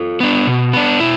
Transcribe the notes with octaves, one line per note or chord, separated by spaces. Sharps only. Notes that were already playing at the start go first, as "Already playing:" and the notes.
Already playing: F4 A4
B3 D4
B2
B3 D4
B2 E4